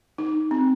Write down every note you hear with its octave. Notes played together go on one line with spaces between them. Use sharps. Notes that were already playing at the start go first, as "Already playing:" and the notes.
D#4
C4